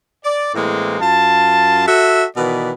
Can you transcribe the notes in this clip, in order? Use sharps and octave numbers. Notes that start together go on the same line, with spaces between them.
D5
A2 E3 G#3 A#3 C4
F#2 F4 A5
F#4 A4 E5
B2 D#3 E3 B4 D5